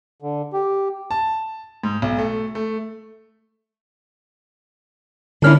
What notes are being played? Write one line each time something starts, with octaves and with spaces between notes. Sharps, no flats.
D3
G4
A5
G#2
B1
A3
A3
D3 A#3 C#4 D4 E4 F6